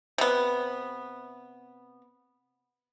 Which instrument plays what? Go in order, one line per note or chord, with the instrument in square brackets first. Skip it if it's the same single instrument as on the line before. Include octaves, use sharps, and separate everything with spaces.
[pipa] C3 B3